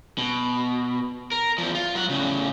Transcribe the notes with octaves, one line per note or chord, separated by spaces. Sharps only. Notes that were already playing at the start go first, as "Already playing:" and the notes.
B2
A#4
E2 F3
F4
F#3 F#5
A2 C#3